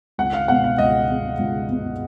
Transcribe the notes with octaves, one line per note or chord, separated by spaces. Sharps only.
C#2 F#5
F5
B2 G#3 F#5
F5
C#2 D#5
B2 G#3
C#2
B2 G#3